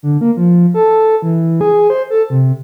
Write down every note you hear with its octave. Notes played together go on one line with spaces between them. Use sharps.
D3
A#3
F3
A4
E3
G#4
C5
A4
C3